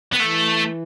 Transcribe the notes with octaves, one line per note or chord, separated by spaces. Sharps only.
B3
E3 A3